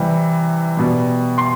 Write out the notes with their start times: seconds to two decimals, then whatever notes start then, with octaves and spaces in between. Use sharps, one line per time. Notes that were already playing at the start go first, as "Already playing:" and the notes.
Already playing: C3 E3 G3
0.77 B2 G3
1.38 C6